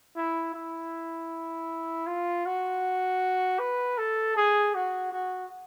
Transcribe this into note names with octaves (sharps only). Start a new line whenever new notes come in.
E4
E4
F4
F#4
B4
A4
G#4
F#4
F#4